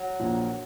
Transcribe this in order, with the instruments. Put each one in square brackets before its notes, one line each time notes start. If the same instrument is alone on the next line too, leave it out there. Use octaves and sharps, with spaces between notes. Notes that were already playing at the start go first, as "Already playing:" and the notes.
Already playing: [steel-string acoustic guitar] F#3
[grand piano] A#1 A#2 F3 A#3